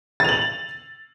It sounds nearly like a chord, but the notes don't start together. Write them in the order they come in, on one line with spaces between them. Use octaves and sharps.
A6 F7 F#7